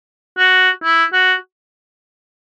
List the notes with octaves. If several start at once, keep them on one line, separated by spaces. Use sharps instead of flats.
F#4
E4
F#4